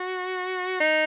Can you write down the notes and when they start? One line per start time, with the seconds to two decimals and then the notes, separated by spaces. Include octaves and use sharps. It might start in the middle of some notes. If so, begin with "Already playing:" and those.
Already playing: F#4
0.80 D#4